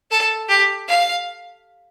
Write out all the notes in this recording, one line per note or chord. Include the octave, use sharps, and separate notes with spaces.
A4
G4
F5